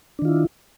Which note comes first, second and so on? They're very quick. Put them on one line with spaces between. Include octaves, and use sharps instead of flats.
D4 D#3 F4 E4